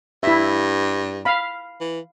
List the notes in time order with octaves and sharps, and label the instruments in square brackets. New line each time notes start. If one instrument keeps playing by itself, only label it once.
[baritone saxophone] G2 [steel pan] E4 E5
[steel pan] F5 B5
[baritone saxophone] E3